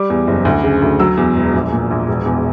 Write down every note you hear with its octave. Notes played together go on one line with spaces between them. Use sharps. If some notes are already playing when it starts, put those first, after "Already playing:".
Already playing: G3 D6
E2
F#1
D2
C#3
D2
F#3 E6
E2
E1
A#1
A#2
A#1
E1
E2